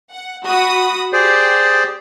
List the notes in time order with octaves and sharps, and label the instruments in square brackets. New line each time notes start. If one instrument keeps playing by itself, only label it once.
[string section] F#5
F#4 B5 D#6
[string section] G4 [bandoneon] G#4 C5 D5